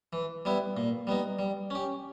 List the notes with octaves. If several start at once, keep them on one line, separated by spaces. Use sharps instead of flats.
E3
G3 B3 E4
A#2
G3 B3 D#4
G3
C#4 G4